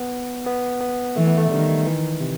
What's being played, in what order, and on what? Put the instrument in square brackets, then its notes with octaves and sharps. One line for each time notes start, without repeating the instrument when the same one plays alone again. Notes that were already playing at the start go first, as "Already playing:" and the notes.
Already playing: [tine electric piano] B3
B3
B3
[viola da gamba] E3 [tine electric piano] A3
[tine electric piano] B3
A3
[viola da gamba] D#3 [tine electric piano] G3
[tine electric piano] E3
C3